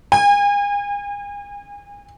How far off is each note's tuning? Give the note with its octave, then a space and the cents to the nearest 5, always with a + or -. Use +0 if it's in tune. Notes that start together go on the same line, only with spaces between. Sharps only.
G#5 -40